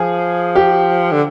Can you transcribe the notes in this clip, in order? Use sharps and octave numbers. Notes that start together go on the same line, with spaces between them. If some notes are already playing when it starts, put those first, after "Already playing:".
Already playing: F3 G#4
G4
D3